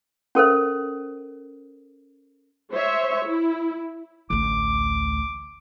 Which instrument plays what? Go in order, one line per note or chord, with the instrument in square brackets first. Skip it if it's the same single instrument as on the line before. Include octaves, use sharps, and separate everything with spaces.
[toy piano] C#4 A4 A#4 C5
[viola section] C5 C#5 E5
E4
[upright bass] A1 D2 [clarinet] D6